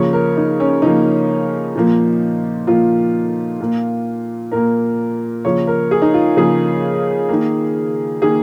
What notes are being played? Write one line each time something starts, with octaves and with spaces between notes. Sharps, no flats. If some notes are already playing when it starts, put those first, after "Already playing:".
Already playing: C#3 F3 A#3 C#5
A#4
D#4
C#4
C#3 F3 A#3 D#4
A#2 F3 A#3
A#2 F3 A#3 F4
A#2 A#3
A#2 A#3 A#4
C#3 F3 A#3 C#5
A#4
G#4
D#4
F4
C#3 F3 A#3 G#4
D#3 A#3
D#3 A#3 G#4